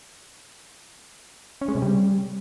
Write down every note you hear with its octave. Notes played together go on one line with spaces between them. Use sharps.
C#4
G#3
C3
G3